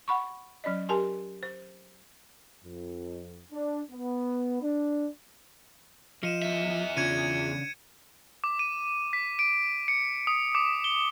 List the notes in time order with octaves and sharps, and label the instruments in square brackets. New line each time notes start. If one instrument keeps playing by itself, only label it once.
[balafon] F#5 B5 C#6
F#3 C#4 D5 D#5
G4 A#4 G#5 A5 C6
C5
[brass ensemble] F2
D4
B3
D4
[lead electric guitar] F3 [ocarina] D#5 [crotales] C#7 D#7 E7
[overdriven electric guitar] E2 E5
[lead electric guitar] C#3 D4 [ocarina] F4 [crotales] G#6 C#7 D#7
[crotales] D6
D#7
B6
D7
C#7
D#6
D6
G7